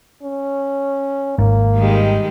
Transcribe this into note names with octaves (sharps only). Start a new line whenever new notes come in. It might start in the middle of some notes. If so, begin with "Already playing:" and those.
C#4
G#1 G#2 A#3
D#3 G3 G#3